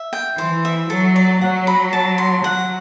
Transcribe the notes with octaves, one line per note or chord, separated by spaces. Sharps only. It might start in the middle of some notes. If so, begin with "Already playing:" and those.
Already playing: E5
G5
E3 C5
E5
F#3 A4
D5
F#3 F#5
B5
A5
C6
F#3 F#5